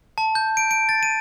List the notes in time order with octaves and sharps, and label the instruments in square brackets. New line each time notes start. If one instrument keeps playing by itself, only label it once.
[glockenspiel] A5
G6
D7
D7
A6
D#7